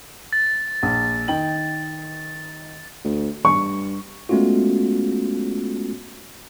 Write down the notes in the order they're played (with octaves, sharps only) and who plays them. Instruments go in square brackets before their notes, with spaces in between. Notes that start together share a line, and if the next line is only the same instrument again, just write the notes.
[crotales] A6
[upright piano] A#1
D#3 G5 F#7
[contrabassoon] D2
[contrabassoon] G2 [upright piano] C#6
[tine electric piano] G#3 A3 B3 C#4 F4 F#4